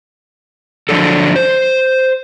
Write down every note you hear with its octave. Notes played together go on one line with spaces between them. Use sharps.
D3 F3 F#3 D4 A4
C5